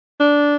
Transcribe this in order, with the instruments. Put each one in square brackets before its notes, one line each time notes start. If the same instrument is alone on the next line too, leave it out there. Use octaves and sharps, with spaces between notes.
[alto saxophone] D4